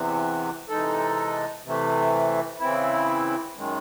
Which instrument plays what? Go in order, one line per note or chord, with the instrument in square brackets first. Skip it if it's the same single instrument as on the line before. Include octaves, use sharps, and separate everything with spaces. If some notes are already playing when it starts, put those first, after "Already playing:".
Already playing: [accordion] E2 C3 E3
C3 E3 G#3 D#4 A4
C3 E3 A3
C#3 E3 C4 E4
F#2 D#3 G#3